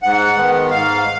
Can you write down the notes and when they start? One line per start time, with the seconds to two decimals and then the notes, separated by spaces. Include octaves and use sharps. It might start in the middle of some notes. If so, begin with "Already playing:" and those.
0.03 G#2 F#5
0.37 D#3 G#3 B3
0.71 G#2 F5